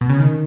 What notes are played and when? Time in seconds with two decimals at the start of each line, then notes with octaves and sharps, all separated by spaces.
0.01 B2
0.10 C#3
0.20 D#3